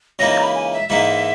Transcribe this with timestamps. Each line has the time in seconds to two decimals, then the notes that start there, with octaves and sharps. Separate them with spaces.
0.19 C#2 C#3 E3 A#3 D#4 A#6
0.30 A#6
0.38 A#5
0.43 B5
0.55 G#5
0.73 E5
0.89 G#2 E3 A#3 D#4 E5